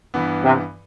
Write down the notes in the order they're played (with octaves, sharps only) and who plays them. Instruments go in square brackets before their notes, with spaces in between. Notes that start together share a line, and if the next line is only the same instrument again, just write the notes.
[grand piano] G2 E3 B3
[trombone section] C3